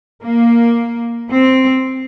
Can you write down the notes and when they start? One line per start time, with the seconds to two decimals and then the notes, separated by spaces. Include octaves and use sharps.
0.22 A#3
1.30 C4